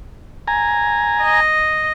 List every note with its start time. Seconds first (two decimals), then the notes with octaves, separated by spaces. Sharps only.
0.48 G#5 A#5
1.21 D#5